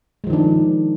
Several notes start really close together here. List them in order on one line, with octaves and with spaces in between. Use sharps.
G#3 F3 D#3 D4